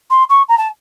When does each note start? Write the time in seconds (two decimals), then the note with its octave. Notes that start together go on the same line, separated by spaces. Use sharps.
0.10 C6
0.29 C#6
0.48 A#5
0.58 A5